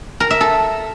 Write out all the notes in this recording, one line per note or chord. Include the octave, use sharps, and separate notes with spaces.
A#4
E5
A4